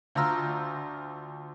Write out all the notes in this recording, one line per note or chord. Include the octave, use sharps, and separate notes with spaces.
D2 F4 A#5 E6 F6